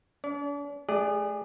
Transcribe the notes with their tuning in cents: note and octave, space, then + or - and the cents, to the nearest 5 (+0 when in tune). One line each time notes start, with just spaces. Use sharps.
D4 -45 D5 -40
A3 -40 G#4 -25 D5 +5